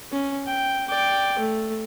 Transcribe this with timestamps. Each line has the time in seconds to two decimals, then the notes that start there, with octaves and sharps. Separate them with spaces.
0.12 C#4
0.47 G5
0.88 D5 G5
1.39 A3